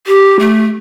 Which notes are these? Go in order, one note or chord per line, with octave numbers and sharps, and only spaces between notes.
G4
A3